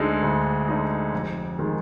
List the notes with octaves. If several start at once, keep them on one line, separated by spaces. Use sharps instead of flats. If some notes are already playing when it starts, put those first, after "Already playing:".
Already playing: D2 D3 G#3 D#4
D2
D3 G#3 D#4
F1
D#3 G#3